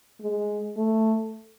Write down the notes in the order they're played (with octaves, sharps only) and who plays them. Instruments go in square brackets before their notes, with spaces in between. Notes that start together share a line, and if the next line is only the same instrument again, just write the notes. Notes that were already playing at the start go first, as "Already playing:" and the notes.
[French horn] G#3
A3